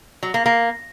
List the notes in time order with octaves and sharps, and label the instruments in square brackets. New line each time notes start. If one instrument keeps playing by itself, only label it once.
[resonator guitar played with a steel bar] F#3
A#3
A#3